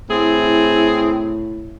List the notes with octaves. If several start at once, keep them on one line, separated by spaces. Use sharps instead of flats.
A2 C4 E4 G#4